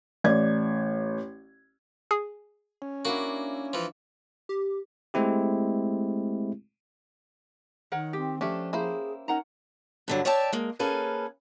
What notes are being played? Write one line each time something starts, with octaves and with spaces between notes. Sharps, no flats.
A1 D5 G#6
G#4
C#4
A#3 D4 E4 F#4
E3 F3
G4
G#3 A3 C4 E4 G4
D#3 A#4 C#5 F#5
C4 G4
F3 A3 C#4 D4 G4
A#3 E4 G#4 C5
C#4 D#4 A#4 F#5 A#5
G2 D3 F#3
C#5 D5 E5 G5 A5
G#3 A#3
A#3 C#4 G#4 A4 B4 F5